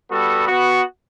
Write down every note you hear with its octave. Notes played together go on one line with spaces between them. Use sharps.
G3 B3 F#4 A4
B3 F#4